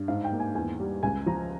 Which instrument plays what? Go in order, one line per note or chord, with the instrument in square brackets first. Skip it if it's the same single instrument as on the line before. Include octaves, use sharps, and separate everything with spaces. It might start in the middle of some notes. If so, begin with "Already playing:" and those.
Already playing: [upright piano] G2
G#2 F5
G5
A#3
G#5
E2 G#5
G3
C#2 G#5
F3 A#5